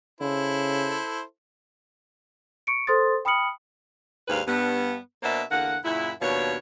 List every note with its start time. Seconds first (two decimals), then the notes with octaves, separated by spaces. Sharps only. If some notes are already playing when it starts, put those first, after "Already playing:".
0.21 C#3 E4 A4 C5
2.67 C#6 C#7 D7
2.87 A4 C5 C6 D#6 A6
3.25 G5 B5 D#6 F6 C#7 F#7
4.28 D#2 G#2 G3 D4 B4 F5
4.47 G2 B3
5.23 B2 A#3 B3 D4 C5 E5
5.51 E2 D3 A#3 F#5
5.84 F#2 A#2 C#3 E4
6.21 D#2 B2 F3 D4 C#5